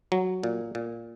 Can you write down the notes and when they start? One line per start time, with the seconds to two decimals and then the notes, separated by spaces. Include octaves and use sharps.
0.12 F#3
0.43 A#2
0.75 A#2